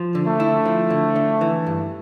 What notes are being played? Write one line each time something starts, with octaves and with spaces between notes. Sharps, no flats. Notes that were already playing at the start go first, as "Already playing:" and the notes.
Already playing: F3
D3
A3
E4
F3
D3
D3
E3
G2